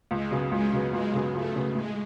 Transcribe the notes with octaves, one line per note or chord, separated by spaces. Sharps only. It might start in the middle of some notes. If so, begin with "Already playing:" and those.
C#2 G#3
C#3 F#3 B3
C#2 G#3
C#3 F#3 B3
C#2 G#3
C#3 F#3 B3
C#2 A3
C#3 F#3 B3
A2 G#3